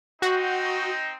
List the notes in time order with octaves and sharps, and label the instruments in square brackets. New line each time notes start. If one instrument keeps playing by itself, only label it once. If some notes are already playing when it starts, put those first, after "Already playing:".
[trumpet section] C4 D#4 [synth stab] F#4